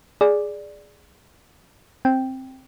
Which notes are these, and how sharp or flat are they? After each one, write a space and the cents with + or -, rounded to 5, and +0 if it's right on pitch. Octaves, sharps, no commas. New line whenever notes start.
G#4 +0 D5 +0
C4 +10 G5 +0